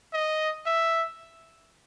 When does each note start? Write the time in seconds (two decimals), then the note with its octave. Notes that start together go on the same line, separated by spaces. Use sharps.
0.13 D#5
0.66 E5